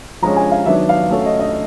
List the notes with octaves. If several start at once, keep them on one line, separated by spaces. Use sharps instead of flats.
F3 G#3 C#4 A#5
G#5
F5
D#3 F#3 B3 D4 E5
F5
A3 C#4 F#4 A4
D#5
D#5